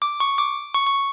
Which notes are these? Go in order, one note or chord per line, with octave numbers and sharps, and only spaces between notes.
D6
C#6
D6
C#6
C#6